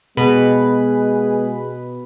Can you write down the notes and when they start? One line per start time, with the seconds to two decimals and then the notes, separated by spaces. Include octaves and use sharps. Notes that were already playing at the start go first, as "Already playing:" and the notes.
0.17 B2 G#3 B3 G#4 B4